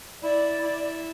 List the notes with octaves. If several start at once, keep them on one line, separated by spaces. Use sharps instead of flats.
E4 D5
E4